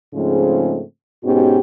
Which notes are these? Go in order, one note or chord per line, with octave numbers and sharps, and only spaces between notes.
G#2 C#3 F3 G#3 A3 C4
G#2 B2 B3 C#4 F#4 G4